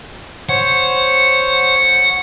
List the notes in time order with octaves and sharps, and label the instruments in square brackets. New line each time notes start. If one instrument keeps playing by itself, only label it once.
[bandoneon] C5 C#5 [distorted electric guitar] F#5